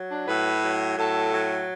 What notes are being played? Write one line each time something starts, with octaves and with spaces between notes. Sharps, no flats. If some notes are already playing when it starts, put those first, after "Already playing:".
Already playing: F#3
D4
A2 B4
F#3
A2 A4
F#3